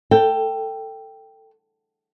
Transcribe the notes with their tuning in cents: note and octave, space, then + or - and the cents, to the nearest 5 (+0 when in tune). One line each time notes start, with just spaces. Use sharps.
A4 +20 G5 +0